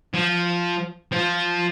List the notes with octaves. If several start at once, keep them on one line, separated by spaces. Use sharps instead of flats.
F3
F3